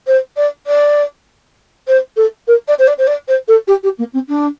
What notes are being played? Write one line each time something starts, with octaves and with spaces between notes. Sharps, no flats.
C5
D5
D5
C5
A4
A#4
D5
C5
D5
C5
D5
C5
A4
G4
G4
A#3
C4
D4